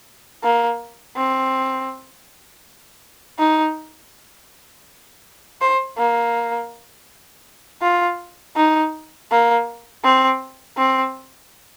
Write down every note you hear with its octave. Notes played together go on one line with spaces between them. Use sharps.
A#3
C4
D#4
C5
A#3
F4
D#4
A#3
C4
C4